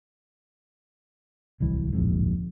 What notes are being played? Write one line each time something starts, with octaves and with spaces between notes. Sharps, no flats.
D1 C2 E3
D1 A#1 F2 G#2